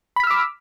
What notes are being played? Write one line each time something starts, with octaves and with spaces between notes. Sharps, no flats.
B5 D6 E6 F6 B6